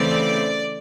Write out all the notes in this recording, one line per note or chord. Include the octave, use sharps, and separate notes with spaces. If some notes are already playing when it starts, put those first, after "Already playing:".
Already playing: C#3 E3 A3 C4 D5